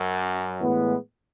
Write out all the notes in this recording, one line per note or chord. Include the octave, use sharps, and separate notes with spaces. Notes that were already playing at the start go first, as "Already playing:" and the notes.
Already playing: F#2
A2 E3 G#3 B3